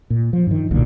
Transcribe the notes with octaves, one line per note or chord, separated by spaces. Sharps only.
A#2
F3
G2 D#3
D1 B1 A#2 D3